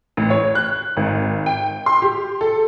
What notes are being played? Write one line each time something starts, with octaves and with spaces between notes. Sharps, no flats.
A1
C#5
F#6
G#1
G5
C6
G4
A4